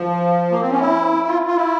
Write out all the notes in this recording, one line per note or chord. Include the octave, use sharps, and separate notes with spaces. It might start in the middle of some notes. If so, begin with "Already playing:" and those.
Already playing: F3
A#3
C4
C#4
E4
F4
F4
E4